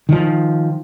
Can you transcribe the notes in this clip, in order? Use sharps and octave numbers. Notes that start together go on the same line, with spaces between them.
D#3 F3